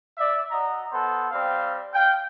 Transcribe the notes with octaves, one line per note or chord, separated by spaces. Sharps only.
D5 E5
F#4 D#5 A#5
B3 A4 C5
G3 C4 F5
F5 G5